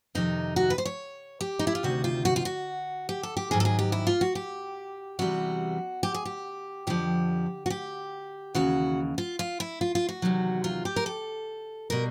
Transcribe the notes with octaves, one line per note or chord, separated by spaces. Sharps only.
F2 C3 D#3 D#4
F#4
B4
C5
C#5
G4
D#4
E4
F4
D2 C3 D#3 F#4
F4
F#4
F4
F#4
G4
A4
G4
G#2 D#3 F#3 G#4
A4
G#4
G4
E4
F4
F#4
G4
E2 C3 E3 G3 F#4
G4
G#4
G4
F2 D3 F3 G4
F#4
G4
D#2 C#3 E3 F#4
F4
F4
E4
F4
F4
F#4
E2 C3 D#3 F#3
F4
G4
A#4
A4
B2 G3 A#4